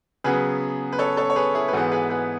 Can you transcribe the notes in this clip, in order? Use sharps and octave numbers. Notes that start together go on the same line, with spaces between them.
C#3 F#3 B3 G#4 B4
B4
A4 C#5
A4 C#5
C#5
G#4 B4
E4 G#4
B4
G#2 E3 G#3 B3 F#4 A4
G#4 B4
G#4 B4